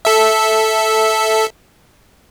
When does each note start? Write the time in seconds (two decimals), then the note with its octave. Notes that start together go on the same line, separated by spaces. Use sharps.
0.05 A4 E5